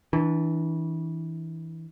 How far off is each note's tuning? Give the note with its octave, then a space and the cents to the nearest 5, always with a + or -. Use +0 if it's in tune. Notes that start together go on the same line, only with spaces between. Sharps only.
E3 -25 D4 +0